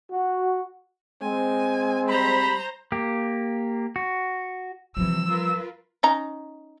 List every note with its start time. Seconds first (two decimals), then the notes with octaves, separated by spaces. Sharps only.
0.12 F#4
1.22 G#3 C4 G#5
2.08 G3 C5 A#5 B5
2.92 A#3 G4
3.96 F#4
4.97 C3 E3 F3 G3 E6
5.29 F4 A#4 B4
6.03 C#4 D#4 A#5